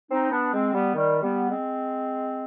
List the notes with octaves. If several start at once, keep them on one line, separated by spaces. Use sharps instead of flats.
C4 D#4
B3 D4
G#3 C4
G3 B3
D#3 G3
G3 B3
G#3 C4